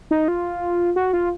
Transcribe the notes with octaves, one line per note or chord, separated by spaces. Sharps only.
D#4
F4
F#4
F4